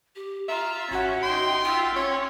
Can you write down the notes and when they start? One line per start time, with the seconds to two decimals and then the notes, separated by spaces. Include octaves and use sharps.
0.16 G4
0.48 F4 E5 A#5
0.91 G#1 C#4 F#4 F#5
1.23 D#4 G5 C6
1.65 F4 E5 G5
1.96 C#4 C#5 C6